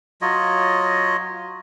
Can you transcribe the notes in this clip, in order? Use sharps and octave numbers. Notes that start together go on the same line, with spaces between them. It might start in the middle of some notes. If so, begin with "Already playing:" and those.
F#3 F4 C#5 D#5